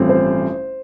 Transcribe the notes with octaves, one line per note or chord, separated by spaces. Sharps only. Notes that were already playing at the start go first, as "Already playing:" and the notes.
Already playing: A1 G2 F3 A3 C4
C5